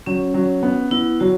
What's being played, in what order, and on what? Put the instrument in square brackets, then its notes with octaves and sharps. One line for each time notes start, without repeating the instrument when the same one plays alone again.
[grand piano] F#3 [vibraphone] C#4
[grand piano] F#3
B3
[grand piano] B3 [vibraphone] E4
[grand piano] F#3 [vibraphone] F#4